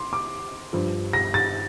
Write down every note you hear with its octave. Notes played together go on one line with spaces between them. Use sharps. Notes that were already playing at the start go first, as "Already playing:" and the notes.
Already playing: C6 D6
D6
G2 F3
A#6
A6